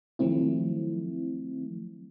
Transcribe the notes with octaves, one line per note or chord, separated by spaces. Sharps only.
D#3 F3 F#3 A3 C4 E4